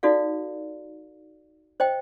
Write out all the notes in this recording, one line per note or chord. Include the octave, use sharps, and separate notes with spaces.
D#4 F#4 A4 D5 F5
C5 D#5 G5